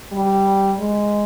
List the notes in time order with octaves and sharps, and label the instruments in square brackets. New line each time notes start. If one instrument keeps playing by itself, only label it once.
[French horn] G3
G#3